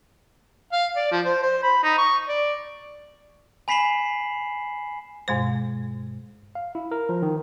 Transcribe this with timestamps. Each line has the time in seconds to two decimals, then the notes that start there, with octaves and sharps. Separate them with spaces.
0.72 F5
0.96 D5
1.11 F3
1.25 C5
1.43 C5
1.63 B5
1.83 D#4
1.98 C#6
2.28 D5
3.68 G#5 B5 B6 C7 E7 F#7
5.28 G2 B2 G#3 C5
6.55 F5
6.75 E4
6.91 A#4
7.09 F3
7.22 D#3